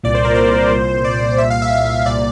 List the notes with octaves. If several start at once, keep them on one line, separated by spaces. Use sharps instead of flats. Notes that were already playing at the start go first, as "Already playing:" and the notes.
C2 A#2 D5
C5
A#4
C5
C2 A#2
D5
C2 A#2 E5
F5
E5
E5
C2 A#2 D5